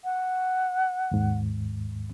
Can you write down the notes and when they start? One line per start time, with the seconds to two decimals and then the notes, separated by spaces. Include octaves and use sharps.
0.04 F#5
1.12 D#2 G#2